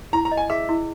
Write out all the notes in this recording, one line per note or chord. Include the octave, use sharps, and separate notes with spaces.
E4 A#5
A#5
D#5
G#5
G#4 E5
E4